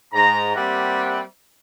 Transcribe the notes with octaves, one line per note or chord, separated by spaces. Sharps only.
G#2 A#5
G3 A#3 C4 G4 E5 F#5